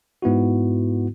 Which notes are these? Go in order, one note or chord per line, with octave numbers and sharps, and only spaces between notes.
G#2 B3 E4 F#4